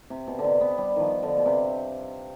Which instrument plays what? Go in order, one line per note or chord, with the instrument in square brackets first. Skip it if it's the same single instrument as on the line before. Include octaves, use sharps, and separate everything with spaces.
[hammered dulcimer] C3
B2
D3
C3
B3
G3
D#3 F3
D3
B2
C3